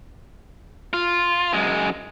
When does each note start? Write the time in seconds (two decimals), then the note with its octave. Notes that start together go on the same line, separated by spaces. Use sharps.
0.93 F4
1.53 F#2 G#3